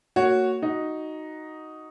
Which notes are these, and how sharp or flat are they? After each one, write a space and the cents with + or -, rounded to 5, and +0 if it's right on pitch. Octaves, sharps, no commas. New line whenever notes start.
A#3 -25 F#4 +0 C#5 +0
D#4 +0 F#4 +0